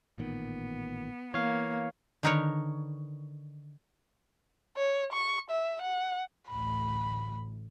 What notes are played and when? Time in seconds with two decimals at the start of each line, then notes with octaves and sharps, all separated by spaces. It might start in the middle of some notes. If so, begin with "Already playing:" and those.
0.18 A1 A#2 D#3 B3
1.34 E3 A#3 C#5 F5
2.23 D3 D#3 D#4 A#4 B4 C#5
4.77 C#5
5.13 C#6
5.50 E5
5.82 F#5
6.49 A1 D2 B5